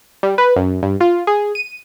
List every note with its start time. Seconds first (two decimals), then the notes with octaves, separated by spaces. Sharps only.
0.23 G3
0.38 B4
0.56 F#2
0.82 G2
1.01 F4
1.27 G#4
1.55 D#7